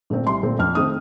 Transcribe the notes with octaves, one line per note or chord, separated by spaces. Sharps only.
A#2 A3 C4
C2 C6
A#2 A3 C4
F2 F6
D#3 A3 C4 D#6